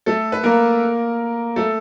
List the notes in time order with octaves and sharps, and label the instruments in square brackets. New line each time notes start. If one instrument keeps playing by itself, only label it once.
[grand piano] A3 A4
B4
A#3 A#4
A3 A4